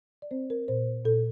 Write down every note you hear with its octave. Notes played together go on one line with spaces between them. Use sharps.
D5
C4 C5
A#4
A#2 C5
A#2 A4